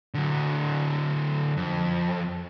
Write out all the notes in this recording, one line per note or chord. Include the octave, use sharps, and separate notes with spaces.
D3 F#3
F2